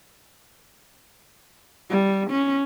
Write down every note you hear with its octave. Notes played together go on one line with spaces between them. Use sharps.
G3
C#4